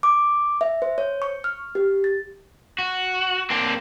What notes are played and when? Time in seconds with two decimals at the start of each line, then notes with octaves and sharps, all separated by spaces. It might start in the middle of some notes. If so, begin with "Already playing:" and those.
0.03 D6
0.61 E5
0.82 C5
0.98 C#5
1.22 C#6
1.44 F6
1.75 G4
2.04 A6
2.78 F#4
3.50 A#3 C4 D4